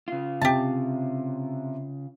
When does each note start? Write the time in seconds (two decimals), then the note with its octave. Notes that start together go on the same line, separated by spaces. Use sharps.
0.08 C#3 F4
0.41 C3 G4 A5